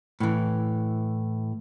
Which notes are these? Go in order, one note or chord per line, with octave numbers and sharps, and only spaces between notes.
A2 E3